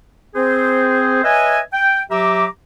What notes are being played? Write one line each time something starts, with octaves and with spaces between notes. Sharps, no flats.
C4 G#4 C5
B4 C#5 D#5 E5 G#5
G5
F#3 G4 E5 A#5 D6